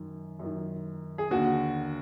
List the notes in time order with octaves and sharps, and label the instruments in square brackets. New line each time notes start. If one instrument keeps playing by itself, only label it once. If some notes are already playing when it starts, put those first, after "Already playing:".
Already playing: [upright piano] F#2 D#3
F#2 D#3
G#4
D#2 D3 F#4